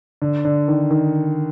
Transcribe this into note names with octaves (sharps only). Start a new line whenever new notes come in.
D3
D3
D#3
D#3